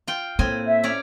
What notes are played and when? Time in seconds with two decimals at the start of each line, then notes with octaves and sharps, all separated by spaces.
0.07 F4 G5
0.39 A2 A#3 C4 G#5
0.66 E5
0.84 C#4 D5 A#5